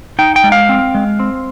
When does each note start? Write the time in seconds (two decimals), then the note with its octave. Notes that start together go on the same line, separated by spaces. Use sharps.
0.19 D#4 G5
0.36 G5
0.44 G#3
0.52 F5
0.69 C4
0.95 G#3
1.20 C4